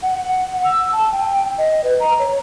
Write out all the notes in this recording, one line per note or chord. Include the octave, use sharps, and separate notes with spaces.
F#5
F#5
E6
A5
G5
D#5
B4
A#5
C#5